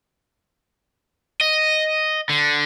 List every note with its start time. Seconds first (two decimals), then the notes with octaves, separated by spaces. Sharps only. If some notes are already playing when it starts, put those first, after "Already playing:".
1.41 D#5
2.29 D3